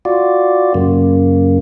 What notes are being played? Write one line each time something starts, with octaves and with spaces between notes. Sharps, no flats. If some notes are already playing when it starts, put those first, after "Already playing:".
F4 F#4 D5
F#2 C#3 A#3